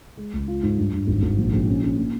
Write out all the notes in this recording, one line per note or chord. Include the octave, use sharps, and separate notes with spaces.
G#3
C#2
F4
G#2
G2
G2
G#1
G#1
A#1
A#1
C#4
C#4
A#2